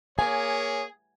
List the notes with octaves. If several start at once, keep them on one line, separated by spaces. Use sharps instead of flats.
A#3 G#4 C#5 G#5